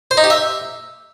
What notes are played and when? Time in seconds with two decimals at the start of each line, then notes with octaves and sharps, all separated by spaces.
0.11 C5
0.17 D#4
0.24 G4
0.30 E5